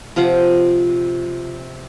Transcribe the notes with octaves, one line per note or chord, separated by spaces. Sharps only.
C3 F3 F4 F#5